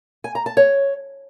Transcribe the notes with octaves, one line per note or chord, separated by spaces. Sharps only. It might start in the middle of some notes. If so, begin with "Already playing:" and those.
G#5
A#5
A5
C#5